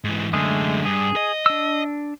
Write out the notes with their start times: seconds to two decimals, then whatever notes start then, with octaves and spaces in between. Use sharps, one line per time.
0.04 G#2 E3
0.33 F#2 D3 G#3 A3 G#4
0.85 G2 G#4
1.16 D#5
1.46 D4 E6